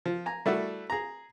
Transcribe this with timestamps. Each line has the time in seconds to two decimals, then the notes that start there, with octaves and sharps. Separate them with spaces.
0.06 F3
0.26 G#5 A#5
0.46 G3 A3 E4 F#4
0.90 G#4 A#5